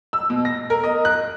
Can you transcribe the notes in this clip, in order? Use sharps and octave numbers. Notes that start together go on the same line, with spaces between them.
E6
B2
A#6
A#4
D#5
F#6